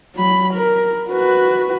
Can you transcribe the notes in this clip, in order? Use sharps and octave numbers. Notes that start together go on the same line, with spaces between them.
F#3 B5
A#4
F#4 B4